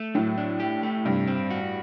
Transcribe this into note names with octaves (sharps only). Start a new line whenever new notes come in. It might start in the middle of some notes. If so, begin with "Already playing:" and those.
Already playing: A3
A2 F#3
D4
G4
A3
G2 C3
C4
F#4